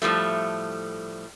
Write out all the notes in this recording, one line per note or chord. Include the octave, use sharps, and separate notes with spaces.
A2 F3 G3 A3